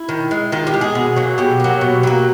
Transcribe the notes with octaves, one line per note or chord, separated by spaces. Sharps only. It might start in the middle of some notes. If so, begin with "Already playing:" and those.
Already playing: E4
D#3
G#3
D#3 F4
G4
G#3
G#4
B2
F#3 A#3
B2 G4
F#3 A#3
B2
F#3 A#3